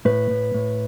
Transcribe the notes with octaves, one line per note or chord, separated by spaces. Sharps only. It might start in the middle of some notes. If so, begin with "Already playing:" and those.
A2 B4
A2
A2